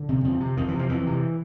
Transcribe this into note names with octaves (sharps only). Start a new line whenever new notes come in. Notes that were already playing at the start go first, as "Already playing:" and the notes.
Already playing: D3
C3
F2
C3
F2 D#3
E3
C3
F3
F2 E3
C3